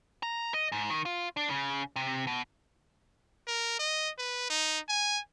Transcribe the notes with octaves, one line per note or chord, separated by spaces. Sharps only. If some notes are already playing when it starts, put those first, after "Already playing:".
A#5
D#5
G#2
D#3
F4
D4
C#3
C3
B2
A#4
D#5
B4
D#4
G#5